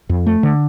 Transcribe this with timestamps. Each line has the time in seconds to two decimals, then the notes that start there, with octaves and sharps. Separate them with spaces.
0.09 F2
0.26 A3
0.43 D3